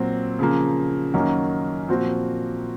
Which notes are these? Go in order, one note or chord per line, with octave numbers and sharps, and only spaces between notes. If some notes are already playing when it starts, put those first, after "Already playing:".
Already playing: A#2 F#3 C4
C#3 F3 A#3
F#2 D#3 F#3 A#3 C#4
A#2 F3 C4 F#4